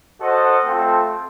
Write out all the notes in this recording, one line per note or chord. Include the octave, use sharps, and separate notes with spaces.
F#4 A4 C5 D#5 F#5
A3 C4 F4 A4